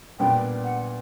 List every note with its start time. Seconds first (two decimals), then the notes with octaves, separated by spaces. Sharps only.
0.19 A#2 G3 B3 D4 G5
0.64 F#5